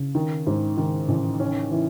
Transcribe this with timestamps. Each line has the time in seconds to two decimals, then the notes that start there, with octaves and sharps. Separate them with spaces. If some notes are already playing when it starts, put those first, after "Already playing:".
Already playing: C#3
0.15 D#3
0.47 G#2
0.77 D#3
1.08 A1
1.39 C#4
1.71 E3